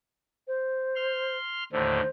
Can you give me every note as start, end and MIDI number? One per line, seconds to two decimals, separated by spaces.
0.48 1.37 72
0.96 1.64 84
0.96 1.64 89
1.72 2.01 39
1.72 2.01 45
1.72 2.01 50
1.72 2.08 72